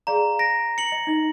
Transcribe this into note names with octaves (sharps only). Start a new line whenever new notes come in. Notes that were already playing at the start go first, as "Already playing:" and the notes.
G#4 D5 F5 A#5
A#6 D7
C#7 F#7
D#5
D#4 D#5